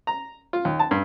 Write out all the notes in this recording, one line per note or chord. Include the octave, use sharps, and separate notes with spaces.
A#5
F4
D#2
A5
G2